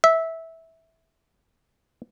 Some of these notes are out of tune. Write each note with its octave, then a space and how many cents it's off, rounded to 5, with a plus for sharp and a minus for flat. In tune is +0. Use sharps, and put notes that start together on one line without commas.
E5 -15